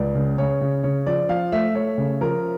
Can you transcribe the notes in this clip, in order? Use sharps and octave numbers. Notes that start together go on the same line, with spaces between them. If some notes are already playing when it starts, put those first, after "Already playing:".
Already playing: C#2 D5
C#3
C#3 C#5
C#3
C#3 C#5
F3 D5
F3 F5
A3 E5
A3 C#5
C#3
F3 A#4